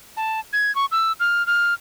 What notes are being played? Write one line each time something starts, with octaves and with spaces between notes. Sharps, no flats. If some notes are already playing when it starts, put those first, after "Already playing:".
A5
G#6
C#6
E6
F6
F6